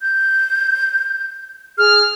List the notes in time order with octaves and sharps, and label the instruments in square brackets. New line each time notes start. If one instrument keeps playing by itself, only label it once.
[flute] G6
[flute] G#4 [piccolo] F6